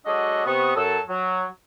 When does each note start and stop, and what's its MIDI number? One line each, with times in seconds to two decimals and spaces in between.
0.06 0.41 54
0.06 0.41 56
0.06 0.41 62
0.06 0.41 66
0.06 0.41 69
0.06 0.41 75
0.45 0.73 48
0.45 0.73 59
0.45 0.73 85
0.45 0.73 87
0.76 0.98 42
0.76 0.98 54
0.76 0.98 69
1.09 1.44 54